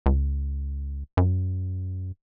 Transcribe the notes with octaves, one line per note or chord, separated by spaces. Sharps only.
C#2
F#2